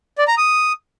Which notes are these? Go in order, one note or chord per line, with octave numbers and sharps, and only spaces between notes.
D5
A#5
D#6